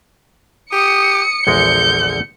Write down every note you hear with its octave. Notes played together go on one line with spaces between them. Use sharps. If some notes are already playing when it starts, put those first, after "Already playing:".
G4 D#6 C#7
A#1 E2 D3 G#3 G6